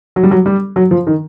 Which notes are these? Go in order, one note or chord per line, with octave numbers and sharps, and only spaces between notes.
F#3
G3
F#3
G3
F#3
F3
D#3